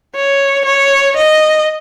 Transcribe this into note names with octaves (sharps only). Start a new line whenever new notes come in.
C#5
C#5
D#5